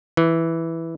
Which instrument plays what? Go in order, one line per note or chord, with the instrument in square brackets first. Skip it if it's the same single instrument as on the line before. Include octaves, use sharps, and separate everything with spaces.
[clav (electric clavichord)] E3